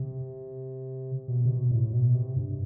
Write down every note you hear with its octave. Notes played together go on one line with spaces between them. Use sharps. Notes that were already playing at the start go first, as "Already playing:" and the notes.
Already playing: C3
B2
C3
B2
A2
B2
C3
G2